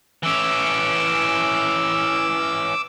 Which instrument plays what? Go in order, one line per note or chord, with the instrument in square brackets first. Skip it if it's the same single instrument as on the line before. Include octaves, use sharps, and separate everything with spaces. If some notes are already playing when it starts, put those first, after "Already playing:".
[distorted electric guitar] E3 C#4 [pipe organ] D6 E6